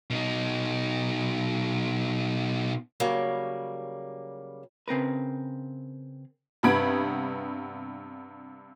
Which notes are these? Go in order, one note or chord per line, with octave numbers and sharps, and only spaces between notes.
B2 D#4
C#3 F#3 G3 A#3
C#3 C4 A#4 B4
G2 C3 B3 B5 G#6 D7